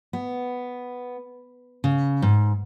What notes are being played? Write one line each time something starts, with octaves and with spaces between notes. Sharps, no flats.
B3
C#3
G#2